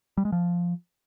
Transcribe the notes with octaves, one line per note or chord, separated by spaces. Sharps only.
G3
G#3
F3